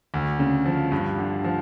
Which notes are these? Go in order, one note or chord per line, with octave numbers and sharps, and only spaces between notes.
D2
C#3
F3
G2
D3
F3